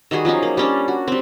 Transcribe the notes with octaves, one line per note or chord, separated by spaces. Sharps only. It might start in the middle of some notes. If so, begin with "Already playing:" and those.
D#3 G3 F#4 G#4
F3 F#3 C#4 D#4
A#3
G3 C#4 D4
F#4
G3 C4